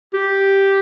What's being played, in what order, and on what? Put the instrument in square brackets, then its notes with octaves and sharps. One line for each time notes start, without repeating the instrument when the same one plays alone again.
[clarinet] G4